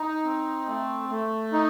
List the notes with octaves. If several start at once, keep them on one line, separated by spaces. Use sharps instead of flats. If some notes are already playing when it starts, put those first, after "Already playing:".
Already playing: D#4
C4
A3
A3
D#4